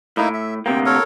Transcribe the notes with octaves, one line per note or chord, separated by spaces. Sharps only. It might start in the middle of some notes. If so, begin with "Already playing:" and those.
A2 A#3 D#4 E4
E5
D2 C3 A#3 G5
A4 A#4 C#5